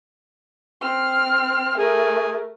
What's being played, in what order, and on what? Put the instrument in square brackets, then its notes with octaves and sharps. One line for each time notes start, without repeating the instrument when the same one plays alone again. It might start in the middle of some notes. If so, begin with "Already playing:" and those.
[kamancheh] C4 F6
[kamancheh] A3 A#4 [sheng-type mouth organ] G#4